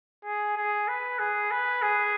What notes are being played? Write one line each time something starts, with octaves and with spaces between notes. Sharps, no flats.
G#4
G#4
B4
G#4
B4
G#4